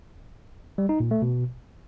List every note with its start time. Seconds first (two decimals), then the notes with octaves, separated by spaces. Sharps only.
0.78 G3
0.89 D#4
1.00 A#2
1.11 A3
1.22 B2